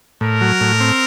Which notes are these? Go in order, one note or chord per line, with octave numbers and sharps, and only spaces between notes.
A2 A#4
F#3
A2
C4